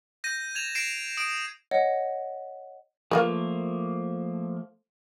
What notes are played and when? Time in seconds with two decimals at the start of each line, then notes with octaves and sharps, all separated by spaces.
0.24 G6 A#6 D#7
0.55 G#6 E7 F7
0.75 A#6 C7 D7 E7
1.17 D#6 D7
1.71 C#5 D#5 F#5
3.11 F3 A3 A#3 F4 A#4 B4